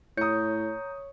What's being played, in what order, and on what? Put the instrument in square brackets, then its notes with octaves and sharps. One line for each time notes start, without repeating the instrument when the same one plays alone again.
[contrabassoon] A2 [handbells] C#5 [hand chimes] A#5 G6 [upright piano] D#6 C#7